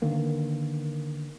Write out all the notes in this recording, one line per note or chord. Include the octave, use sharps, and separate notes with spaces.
D3 D#3 A#3 B3